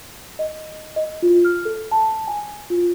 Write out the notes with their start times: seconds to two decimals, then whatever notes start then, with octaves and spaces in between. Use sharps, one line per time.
0.39 D#5
0.96 D#5
1.22 F4
1.45 F6
1.65 A4
1.91 A5
2.27 G#5
2.70 F4